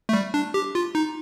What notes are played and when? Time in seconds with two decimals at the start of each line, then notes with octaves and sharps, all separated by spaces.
0.09 A3
0.13 G3
0.34 D4
0.54 G4
0.75 F4
0.95 D#4